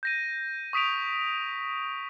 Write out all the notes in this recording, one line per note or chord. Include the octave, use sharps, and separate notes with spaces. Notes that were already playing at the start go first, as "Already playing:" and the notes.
G6 A#6 D#7
C#6 D#6 B6 D7 F7